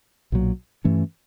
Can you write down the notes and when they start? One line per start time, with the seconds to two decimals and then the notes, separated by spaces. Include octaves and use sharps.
0.32 B1 A#2 F#3
0.85 G2 E3 A3 C#4